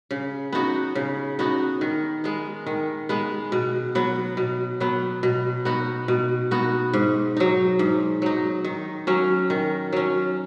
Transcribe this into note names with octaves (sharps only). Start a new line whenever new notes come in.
C#3
B3 D#4 F#4
C#3
B3 D#4 F#4
D#3
G#3 B3
D#3
G#3 B3
B2
F#3 B3
B2
F#3 B3
B2
B3 D#4 F#4
B2
B3 D#4 F#4
G#2
F#3 D#4
G#2
F#3 D#4
D#3
F#3 C#4
D#3
F#3 C#4